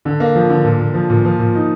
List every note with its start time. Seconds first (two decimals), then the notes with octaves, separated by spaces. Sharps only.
0.05 D3
0.20 A#3
0.35 F3
0.50 D3
0.65 A#2
0.80 A#2
0.94 F3
1.10 A#2
1.25 F3
1.39 A#2
1.55 D#4